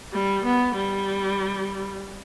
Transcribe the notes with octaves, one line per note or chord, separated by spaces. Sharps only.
G3
B3
G3